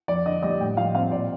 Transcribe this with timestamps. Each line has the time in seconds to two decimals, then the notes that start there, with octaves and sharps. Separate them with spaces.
0.08 F2 D5
0.26 D3 D#5
0.43 G3 D#5
0.60 A2 G5
0.77 F3 F5
0.95 C4 F5
1.11 A#2 D5